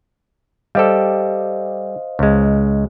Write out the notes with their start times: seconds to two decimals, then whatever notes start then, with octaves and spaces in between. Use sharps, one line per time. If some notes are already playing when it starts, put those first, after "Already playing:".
0.75 G3 G4 A4 C5 D#5 F5
2.19 C#2 G#3